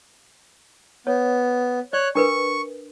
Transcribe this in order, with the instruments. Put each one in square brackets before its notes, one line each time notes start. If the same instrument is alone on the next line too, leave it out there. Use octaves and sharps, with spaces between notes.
[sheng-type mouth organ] B3 [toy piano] C#5
[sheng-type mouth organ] C#5 F#6 [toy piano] D5
[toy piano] D4 A#4 B4 [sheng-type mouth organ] C#6